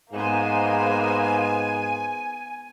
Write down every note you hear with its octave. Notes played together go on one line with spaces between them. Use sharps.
G#2 A#3 B3 C5 F5 G#5